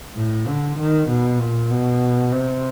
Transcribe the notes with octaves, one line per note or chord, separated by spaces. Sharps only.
A2
D3
D#3
B2
A#2
B2
C3